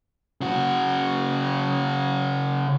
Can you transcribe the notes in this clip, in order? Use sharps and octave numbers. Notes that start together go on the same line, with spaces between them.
C#3 F#4